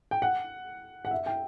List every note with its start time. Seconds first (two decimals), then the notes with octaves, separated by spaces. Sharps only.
0.11 G5
0.22 F#5
1.05 F#5
1.11 E5
1.26 G5